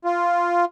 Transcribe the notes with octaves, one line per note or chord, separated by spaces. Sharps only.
F4